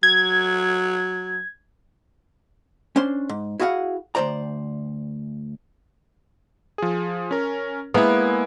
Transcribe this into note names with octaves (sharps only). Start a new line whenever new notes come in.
F#3 G#6
C#4 D4 C5 C6
G#2
E4 F#4 G#4 F5 F#5
D2 G2 C5 D5 A#5
F3 G#4
C#4 A#4
G#3 A#3 B3 E4 B4